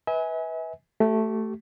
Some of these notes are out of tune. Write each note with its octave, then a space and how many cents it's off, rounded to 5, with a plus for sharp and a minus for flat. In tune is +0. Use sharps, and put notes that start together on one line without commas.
B4 +0 E5 -40 G#5 +0
A3 +0 G4 -30